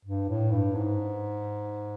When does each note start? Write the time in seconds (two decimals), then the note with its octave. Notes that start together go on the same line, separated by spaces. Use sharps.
0.05 G2
0.29 A2
0.52 G2
0.75 G#2